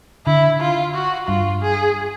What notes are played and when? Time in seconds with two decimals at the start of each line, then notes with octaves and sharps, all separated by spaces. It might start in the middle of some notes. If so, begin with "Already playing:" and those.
0.26 D3 E4
0.60 F4
0.94 F#4
1.28 G2 F4
1.62 G#4